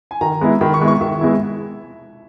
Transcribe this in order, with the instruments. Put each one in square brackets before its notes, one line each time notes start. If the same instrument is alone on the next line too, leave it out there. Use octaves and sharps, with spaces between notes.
[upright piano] G#5
[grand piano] D#3 [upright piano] A#5
[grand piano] G#3 B3 E4
[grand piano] D#3 [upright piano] B5
[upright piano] C#6
[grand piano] G#3 B3 E4
[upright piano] C#6
[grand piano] D#3 [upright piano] E5
[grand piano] G#3 B3 E4